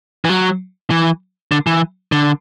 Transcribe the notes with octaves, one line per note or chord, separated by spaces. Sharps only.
E3
F#3
E3
D3
E3
D3